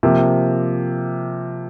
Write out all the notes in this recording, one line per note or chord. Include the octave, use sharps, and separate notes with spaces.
C3 F3 A#3